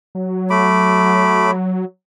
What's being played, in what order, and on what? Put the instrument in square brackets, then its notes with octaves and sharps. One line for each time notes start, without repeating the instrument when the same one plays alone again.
[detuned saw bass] F#3
[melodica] A3 B5 D6